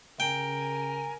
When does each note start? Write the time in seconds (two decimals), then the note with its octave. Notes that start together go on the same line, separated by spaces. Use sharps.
0.20 C#3 A#4 G5 G#5